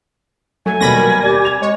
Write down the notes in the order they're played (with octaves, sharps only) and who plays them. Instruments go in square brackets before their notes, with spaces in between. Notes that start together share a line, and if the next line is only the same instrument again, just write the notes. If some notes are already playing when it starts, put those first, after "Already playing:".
[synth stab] F#3 [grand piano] A3 [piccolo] G#5
[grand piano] D#2 G3 [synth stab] B2 B5 A#6
[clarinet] A#4
[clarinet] G4 [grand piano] D5
[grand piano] G#6 F7
[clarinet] G#3 [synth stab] C#5